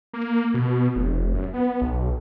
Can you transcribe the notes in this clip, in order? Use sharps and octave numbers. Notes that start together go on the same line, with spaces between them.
A#3
B2
F1
F#2
B3
B1